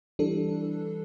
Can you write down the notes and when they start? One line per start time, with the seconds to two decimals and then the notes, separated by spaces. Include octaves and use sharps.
0.19 E3 G3 D4 A4